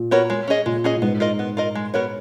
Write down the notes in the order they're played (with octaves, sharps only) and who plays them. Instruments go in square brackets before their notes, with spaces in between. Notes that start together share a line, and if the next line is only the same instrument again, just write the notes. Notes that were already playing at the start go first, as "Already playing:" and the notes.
Already playing: [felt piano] A#2
[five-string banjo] B3 F#4 A#4 C#5
G#3
C#4 G#4 D#5
[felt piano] A#2 [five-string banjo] G#3
[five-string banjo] C#4 G#4 D#5
[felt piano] A#2
[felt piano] G#2 [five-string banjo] B3
[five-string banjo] F4 A#4 D#5
B3
F4 A#4 D#5
G#3
B3 F#4 A#4 C#5